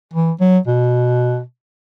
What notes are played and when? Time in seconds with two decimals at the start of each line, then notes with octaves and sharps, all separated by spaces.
0.14 E3
0.40 F#3
0.67 B2